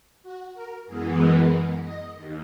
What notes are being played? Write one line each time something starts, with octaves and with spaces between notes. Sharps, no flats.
F#4
A#4
F#2 E3 G#3 B3 G#4
A#4
D#5
D#2